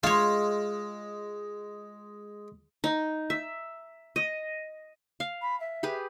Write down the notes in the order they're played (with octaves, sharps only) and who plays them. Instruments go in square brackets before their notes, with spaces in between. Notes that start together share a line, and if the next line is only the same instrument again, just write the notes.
[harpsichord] G#3 [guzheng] F4 C#5
[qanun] D#4
E5
D#5
F5
[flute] B5
E5
[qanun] G4 G#4 B4